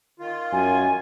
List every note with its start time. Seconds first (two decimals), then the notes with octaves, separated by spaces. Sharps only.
0.20 D#3 F4
0.52 F#2 G#5